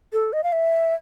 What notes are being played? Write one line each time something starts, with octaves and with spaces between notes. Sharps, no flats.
A4
D#5
F5
E5